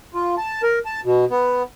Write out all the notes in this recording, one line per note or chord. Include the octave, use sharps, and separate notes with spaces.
F4
A5
A#4
A5
B2
B3